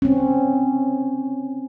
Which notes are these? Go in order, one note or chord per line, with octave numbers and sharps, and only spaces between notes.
C4 C#4